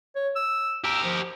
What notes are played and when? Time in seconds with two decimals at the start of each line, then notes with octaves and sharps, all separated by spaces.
0.16 C#5
0.36 E6
0.84 G4 A#4 E6
1.04 F3